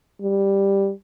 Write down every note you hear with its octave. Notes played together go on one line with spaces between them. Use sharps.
G3